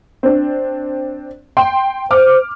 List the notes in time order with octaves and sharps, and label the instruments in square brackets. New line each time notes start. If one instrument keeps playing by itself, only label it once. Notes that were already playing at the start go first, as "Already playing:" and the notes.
[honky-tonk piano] C4 D4
G5 C6
[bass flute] C5 [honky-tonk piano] D6 F6